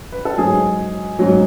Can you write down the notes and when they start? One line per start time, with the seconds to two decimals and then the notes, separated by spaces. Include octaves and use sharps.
0.12 B4
0.25 A4
0.38 G#2 F#3 G#4
1.19 G#2 F#3